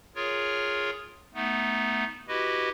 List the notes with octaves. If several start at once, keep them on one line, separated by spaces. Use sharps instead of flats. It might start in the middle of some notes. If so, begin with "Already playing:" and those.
F4 G#4 A#4 C#5
A3 B3 D#4
E4 F#4 G4 B4 D#5